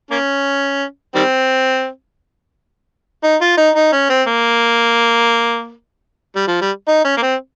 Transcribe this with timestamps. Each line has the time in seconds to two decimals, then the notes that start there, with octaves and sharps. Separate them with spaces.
0.11 A#3 C#4
1.15 D#3 G3 C4
3.23 D#4
3.41 F4
3.57 D#4
3.75 D#4
3.92 C#4
4.10 C4
4.27 A#3
6.36 G3
6.47 F3
6.61 G3
6.88 D#4
7.05 C#4
7.17 A#3
7.22 C4